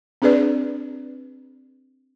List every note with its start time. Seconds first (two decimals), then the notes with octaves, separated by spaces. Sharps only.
0.22 C4 D4 G#4 B4 D5